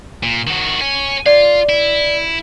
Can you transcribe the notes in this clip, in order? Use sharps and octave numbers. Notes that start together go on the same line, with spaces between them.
A#2
D#3 F#4
C#5 G#5
F4 D5 F5
E4